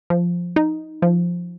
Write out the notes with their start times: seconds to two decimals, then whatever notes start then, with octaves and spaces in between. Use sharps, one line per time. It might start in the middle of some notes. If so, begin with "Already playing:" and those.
0.10 F3
0.56 D#4
1.02 F3